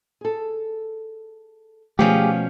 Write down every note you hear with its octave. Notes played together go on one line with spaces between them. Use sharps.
G#4 A4
B2 F3 G3 A3 C#4 G4 G#4